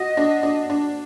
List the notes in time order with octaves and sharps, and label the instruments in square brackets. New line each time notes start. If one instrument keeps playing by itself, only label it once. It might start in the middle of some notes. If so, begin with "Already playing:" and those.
Already playing: [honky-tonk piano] F#4 [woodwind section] D#5
[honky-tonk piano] D4
D4
D4